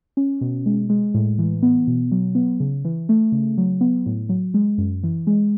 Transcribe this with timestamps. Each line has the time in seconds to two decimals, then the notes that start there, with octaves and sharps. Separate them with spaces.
0.17 C#4
0.41 B2
0.66 G#3
0.90 G#3
1.14 A2
1.39 E3
1.62 B3
1.87 B2
2.11 F#3
2.35 B3
2.60 C#3
2.85 E3
3.09 A3
3.32 C#3
3.58 F#3
3.81 B3
4.06 A2
4.29 F#3
4.54 G#3
4.78 F#2
5.03 E3
5.27 G#3